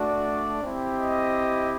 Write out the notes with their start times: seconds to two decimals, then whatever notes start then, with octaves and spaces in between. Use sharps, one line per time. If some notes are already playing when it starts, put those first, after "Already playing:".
Already playing: A3 D4 F#4 D5
0.63 C4 E4 G4
0.97 D#5